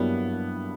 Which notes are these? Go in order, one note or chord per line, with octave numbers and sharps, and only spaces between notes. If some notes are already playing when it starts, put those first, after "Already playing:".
Already playing: G2 F#3 G3 A#3 B3 E4 G4